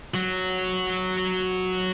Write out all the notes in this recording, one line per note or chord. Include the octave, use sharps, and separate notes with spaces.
F#3 F#4